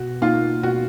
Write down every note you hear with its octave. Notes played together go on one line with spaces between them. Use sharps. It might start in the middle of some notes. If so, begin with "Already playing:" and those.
Already playing: B2 F#4
A#3 D#4 F4
B2 F#4